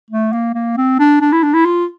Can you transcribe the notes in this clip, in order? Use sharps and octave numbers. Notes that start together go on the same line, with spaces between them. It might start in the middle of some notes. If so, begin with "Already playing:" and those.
A3
A#3
A#3
C4
D4
D4
E4
D4
E4
F4